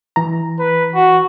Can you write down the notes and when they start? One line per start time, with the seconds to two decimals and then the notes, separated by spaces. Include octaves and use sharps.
0.16 E3 A#5
0.59 B4
0.95 F#4